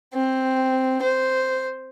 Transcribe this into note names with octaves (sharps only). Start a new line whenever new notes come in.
C4
C5